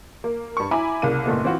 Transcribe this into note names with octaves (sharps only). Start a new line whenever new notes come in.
A#3
G2 C#6
E4 G#5 A#5 B5 D6
C2 C#3 A#3 F5 D#7
F#1 A#2 A3 B3
E3 C4 F4 F#4